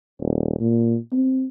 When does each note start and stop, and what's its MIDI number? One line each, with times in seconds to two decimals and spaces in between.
0.20 0.55 27
0.60 0.97 46
1.12 1.46 60